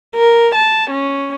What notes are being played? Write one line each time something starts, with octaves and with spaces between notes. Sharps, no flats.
A#4
A5
C#4